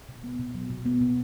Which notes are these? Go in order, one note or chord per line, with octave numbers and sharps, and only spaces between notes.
B2
B3
B2
F#3
B2
B3
B2